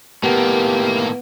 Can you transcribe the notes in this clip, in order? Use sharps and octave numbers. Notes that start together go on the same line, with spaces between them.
A2 D#3 A#3 B3 G4